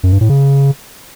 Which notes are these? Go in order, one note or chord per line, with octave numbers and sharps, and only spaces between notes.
F#2
G2
A2
C#3